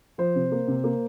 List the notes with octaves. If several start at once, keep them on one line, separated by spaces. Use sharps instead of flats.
F3 C5
C3
A#3
C3
A#3